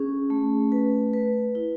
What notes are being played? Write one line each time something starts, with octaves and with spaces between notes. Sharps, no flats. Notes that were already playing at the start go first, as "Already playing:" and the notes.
Already playing: C#4 G#4
A3
B4
B4
E4